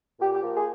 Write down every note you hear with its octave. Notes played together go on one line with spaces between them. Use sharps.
A#2 G4
G4
F3 A#3
G#4